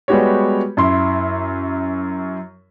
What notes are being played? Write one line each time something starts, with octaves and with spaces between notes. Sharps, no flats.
G3 G#3 B3 F#4 G4 C#5
F#2 E4 C6